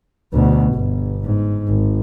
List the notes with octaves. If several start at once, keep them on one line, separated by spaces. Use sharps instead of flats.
D2 B2
G1
G#2
G#1